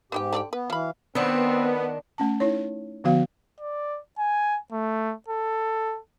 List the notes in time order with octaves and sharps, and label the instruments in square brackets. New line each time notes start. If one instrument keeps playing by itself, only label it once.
[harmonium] G#2 G4 [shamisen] B3 D#4 G5
[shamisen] D3 D5 G5
[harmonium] B3 [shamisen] B4
[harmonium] E3 F5 [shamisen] F#3 B5
[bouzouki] D#3 D4 [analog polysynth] B3 [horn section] C4
[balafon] A3 C#4 A5
D#4 E4 C#5
D3 F3 B3 F#4 F5
[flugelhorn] D5
G#5
A3
A4